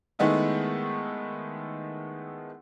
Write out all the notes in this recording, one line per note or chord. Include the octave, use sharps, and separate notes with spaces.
D#3 G#3 A3 B3 D#4 E4